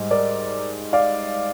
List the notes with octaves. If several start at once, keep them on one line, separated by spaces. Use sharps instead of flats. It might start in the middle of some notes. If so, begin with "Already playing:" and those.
Already playing: G#2 G3
A#4 D5
D5 F5